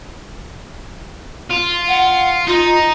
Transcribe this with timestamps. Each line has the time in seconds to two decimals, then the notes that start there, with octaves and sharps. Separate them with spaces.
1.51 F4
1.88 F#5
2.47 D#4 F4